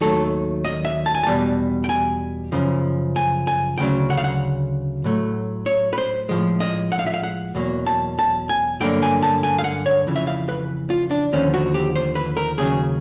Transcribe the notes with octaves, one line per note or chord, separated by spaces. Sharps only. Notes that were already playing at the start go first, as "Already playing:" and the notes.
D#2 D#3 F#3 A3 A4
D#5
E5
A5
G#5
E2 B2 G3 A5
G5
G#5
F#2 C#3 F3
G#5
G#5
D2 C#3 F#3 G5
F#5
F5
F#5
A2 F#3 A3
C#5
B4
C5
A2 F3 G#3
D#5
F#5
F5
E5
F5
F#5
E2 B2 F#3 A#3
A5
A5
G#5
G2 D3 F#3 A#3 G5
G#5
A5
G#5
F5
F#5
C#5
F2 C#3 E3
E5
F5
B4
F4
D4
D#2 D3 F3 C#4
F#4
G4
C5
B4
A#4
D#2 C#3 F#3 G#4